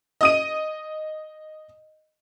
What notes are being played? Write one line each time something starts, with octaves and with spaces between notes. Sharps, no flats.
D#5 D#6 D#7